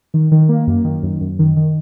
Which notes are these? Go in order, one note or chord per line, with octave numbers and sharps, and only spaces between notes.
D#3
D#3
A#3
F#2
D#3
F#2
F#2
D#3
D#3